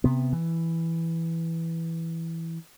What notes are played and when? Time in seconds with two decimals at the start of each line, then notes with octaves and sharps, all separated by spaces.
0.04 C3 B3
0.33 E3